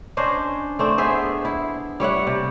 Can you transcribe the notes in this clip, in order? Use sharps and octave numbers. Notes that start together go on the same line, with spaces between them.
C#4 D4 C5 D#5
A3 C4 D4
B3 G#4 C5 E5
E4
G3 C#5 E5 F#5
C3